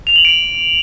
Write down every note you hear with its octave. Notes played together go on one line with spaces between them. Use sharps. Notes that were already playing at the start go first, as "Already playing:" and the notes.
F7
F#7
D7